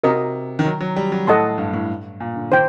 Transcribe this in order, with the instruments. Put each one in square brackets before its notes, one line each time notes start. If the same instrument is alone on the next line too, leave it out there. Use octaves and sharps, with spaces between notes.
[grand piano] C3 [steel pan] F#4 A#4 D#5
[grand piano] D#3
F#3
F#3
G3
F#3
[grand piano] A2 [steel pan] A4 D#5 F#5 A5 C6
[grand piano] G2
A2
A#2
D3
[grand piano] D#3 [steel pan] C5 G5